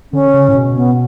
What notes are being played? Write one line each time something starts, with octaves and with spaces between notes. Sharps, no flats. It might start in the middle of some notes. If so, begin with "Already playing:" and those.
D3 C#4
C#3
A2
B2
B3